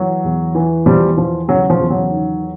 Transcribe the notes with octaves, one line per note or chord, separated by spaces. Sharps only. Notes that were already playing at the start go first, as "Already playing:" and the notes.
Already playing: E3 F#3
E2
E3
E2 F3 G3
E3 F3
C#3 F#3
F3
E2
F#3
D#3